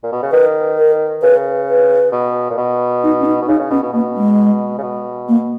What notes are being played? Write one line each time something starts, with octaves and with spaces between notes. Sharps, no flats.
A#2
B2
C#3
D#3 B4
A#4
C#3 B4
B4
B2
A#2
B2
D#4
C#4
D#4
B2
C#3 D#4
C#3
B2 C#4
B2
B2 A#3
G#3
C#3
B2
A#3